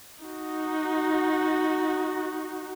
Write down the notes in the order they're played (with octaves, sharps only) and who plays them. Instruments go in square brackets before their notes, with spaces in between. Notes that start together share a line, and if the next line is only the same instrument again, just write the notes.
[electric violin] D#4 F#4